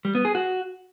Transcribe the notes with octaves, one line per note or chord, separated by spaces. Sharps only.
G3
B3
G#4
F#4